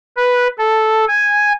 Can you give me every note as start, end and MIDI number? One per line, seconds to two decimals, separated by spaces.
0.17 0.48 71
0.58 1.05 69
1.08 1.53 80